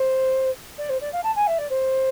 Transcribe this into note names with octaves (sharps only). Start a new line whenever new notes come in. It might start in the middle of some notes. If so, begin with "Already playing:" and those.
Already playing: C5
D5
C5
D5
F5
A5
G#5
E5
D5
C5